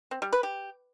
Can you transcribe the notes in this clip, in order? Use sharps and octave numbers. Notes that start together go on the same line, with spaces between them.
C4
G3
B4
G4